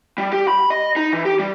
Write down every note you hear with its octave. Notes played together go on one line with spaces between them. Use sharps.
G3
G4
B5
D#5
D#4
E3
G4
G3